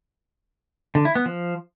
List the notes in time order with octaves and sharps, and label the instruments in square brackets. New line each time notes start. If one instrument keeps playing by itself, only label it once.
[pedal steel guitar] D3
E4
B3
F3